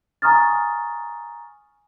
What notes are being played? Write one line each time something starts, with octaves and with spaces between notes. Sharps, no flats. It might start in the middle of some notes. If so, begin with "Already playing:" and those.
G#5 A#5 C#6 D#6 F6 A6